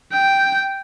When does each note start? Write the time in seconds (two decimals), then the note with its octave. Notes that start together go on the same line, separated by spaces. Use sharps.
0.12 G5